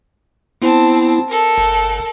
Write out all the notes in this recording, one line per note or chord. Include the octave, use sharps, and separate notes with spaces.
B3 C4 E4 A5
A4 A#4
G1